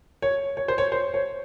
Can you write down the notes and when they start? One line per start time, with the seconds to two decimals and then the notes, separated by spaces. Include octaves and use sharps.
0.22 C#5
0.57 C#5
0.68 C5
0.78 C#5
0.92 C5
1.14 C#5